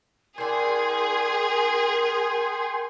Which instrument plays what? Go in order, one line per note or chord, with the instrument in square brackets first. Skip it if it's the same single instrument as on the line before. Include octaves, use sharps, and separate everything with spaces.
[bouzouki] D4 E4 [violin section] G#4 [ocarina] A#4 [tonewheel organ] G5 G#5 C6